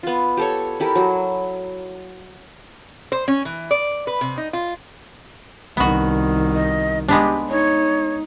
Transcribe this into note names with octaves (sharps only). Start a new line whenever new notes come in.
B3 F4
G4 A4 C#5
E4 G4 A4 A#4
F#3
C5
C#4
E3
D5
B4
C3
D#4
F4
C2 D#3 B3 F#4
D#5
G#3 B3 D4 G4
D#4 C#5